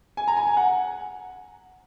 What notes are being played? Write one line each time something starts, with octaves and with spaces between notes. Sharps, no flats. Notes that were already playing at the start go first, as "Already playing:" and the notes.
G#5
A#5
G#5
G#5
F#5